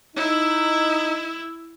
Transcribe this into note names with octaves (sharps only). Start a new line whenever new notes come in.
D#4 E4